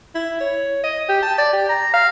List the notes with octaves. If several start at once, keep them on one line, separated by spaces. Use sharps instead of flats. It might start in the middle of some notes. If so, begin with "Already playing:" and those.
E4
C#5
D#5
G4
A5
D5
G4
A#5
F5